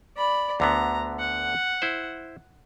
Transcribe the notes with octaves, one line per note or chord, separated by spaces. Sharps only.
D5 B5
D2 D3 B3 A#5
F#5
E4 C5